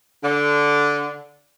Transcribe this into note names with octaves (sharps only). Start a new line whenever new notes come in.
D3